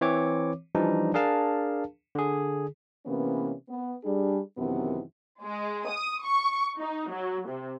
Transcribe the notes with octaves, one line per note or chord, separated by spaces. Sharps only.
E3 C4 C#5 D6
E3 F3 G3 D4 D#4
D4 G#4 A#4 F5 A5
D3 G#4
C3 E3 A#3 B3 C#4
B3
G3 D4 G#4
F#2 C3 D#3 E3 B3
G#3
D#6
C#6
D#4
F#3
C3